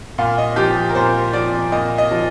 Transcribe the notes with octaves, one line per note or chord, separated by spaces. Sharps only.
A#2 F5
D#5
F3 G4
A#4
A#2 C5
F3 D5
A#2 D#5
D#5
F3